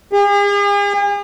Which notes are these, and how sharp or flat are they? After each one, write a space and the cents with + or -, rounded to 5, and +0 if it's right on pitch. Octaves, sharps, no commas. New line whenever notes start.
G#4 -45